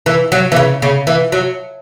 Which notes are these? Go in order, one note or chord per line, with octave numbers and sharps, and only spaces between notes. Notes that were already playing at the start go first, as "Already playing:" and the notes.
E3
F#3
E3
C#3
C#3
E3
F#3